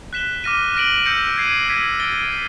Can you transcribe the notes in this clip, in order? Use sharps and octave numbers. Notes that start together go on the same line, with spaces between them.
F#6 B6 E7 G7
D6 F6 A#6 D#7
F6 A#6 D7 F#7
E6 G6 A#6 C#7
G#6 C7 D#7
G#6 B6 D#7 F#7
A6 D7 G7
G#6 B6